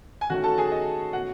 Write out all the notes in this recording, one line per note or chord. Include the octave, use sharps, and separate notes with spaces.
G#5
D#3 A3 C#4 F#4 F#5
A4 A5
G#4 G#5
D#5
B2 A3 C#4 F#4 F#5